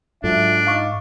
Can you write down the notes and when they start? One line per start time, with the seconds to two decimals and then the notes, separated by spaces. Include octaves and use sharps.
0.24 G#2 F#3 D4 F4 A4 E5
0.67 D#4 F5 C#6 D6